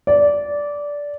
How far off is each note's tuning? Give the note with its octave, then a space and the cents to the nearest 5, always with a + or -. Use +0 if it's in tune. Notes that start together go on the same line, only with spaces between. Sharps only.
D5 -15